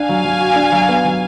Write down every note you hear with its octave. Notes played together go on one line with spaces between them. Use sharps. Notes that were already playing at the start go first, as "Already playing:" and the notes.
Already playing: D4 F5 G#5
F#3
F#3
F#4
D4
F#3
B3
F#3